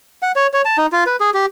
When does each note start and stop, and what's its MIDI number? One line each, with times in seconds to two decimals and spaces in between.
0.22 0.32 78
0.36 0.47 73
0.53 0.62 73
0.65 0.77 81
0.78 0.87 63
0.92 1.04 65
1.06 1.16 71
1.20 1.30 68
1.34 1.46 67